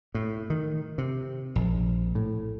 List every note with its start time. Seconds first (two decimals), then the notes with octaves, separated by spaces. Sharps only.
0.15 A2
0.50 D#3
0.98 C3
1.56 A#1
2.15 A2